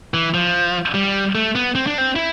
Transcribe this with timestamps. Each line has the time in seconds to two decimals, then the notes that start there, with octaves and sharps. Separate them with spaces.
0.14 E3
0.34 F3
0.94 G3
1.35 A3
1.55 B3
1.75 C4
1.87 D4
1.98 C4
2.16 E4